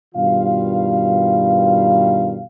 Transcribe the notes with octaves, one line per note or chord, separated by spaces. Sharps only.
G2 B2 D#3 G3 F4 F5